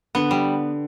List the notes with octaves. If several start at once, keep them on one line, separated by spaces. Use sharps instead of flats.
D3 B3
G3